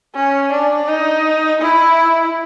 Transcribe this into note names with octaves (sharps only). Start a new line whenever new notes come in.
C#4
D4
D#4
E4